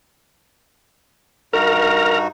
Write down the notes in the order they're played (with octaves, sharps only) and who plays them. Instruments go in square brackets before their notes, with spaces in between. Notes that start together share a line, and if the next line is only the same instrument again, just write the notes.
[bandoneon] G2 D#4 F#4 [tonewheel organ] A#4 A#5